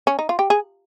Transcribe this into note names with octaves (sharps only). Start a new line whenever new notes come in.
C#4
D#4
F4
G4
G#4